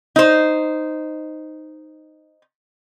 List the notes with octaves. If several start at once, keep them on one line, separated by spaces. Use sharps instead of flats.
D#4 C5